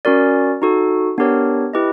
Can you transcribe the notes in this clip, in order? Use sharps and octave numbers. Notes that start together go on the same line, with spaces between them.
C#4 F#4 A#4 D5
D#4 F#4 A4
B3 D4 G4 A#4 C#5
E4 G4 B4 D#5